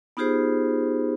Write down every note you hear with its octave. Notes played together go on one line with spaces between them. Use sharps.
B3 D#4 F4 G4 G#4 C5